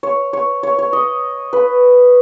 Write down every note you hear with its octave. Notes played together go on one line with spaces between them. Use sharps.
C#5
C#5
C#5
C#5
D#5
B4